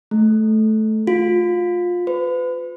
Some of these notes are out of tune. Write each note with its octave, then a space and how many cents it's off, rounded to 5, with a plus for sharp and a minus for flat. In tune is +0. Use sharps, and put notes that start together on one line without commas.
A3 -15
F4 +20
B4 +35